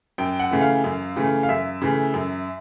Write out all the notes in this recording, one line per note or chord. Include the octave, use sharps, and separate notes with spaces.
F#2 G5
F#5
C#3 E3 A3
F5
F#2
C#3 E3 A3
F5
F#2 E5
C#3 E3 A3
F#2